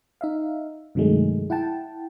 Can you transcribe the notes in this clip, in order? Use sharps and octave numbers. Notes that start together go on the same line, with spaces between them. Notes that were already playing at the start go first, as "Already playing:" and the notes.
D#4 E5 F5
G2 C3 D#3 F#3 G#3 A3
E4 F#5 G5 A5